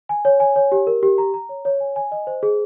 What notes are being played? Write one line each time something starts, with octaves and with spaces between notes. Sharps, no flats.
G#5
C#5
G#5
C#5
G4
A#4
G4
A#5
A#5
C#5
C#5
G#5
G#5
D#5
C5
G#4